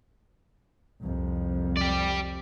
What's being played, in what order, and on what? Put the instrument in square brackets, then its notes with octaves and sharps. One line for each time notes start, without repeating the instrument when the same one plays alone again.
[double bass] C2 F2
[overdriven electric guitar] G4 D5